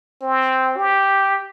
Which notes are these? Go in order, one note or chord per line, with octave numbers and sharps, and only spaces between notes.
C4
G4